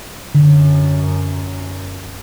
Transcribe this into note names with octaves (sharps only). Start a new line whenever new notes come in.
F#2 D3